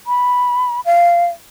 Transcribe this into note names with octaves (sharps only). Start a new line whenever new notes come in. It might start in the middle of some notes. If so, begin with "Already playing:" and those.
B5
F5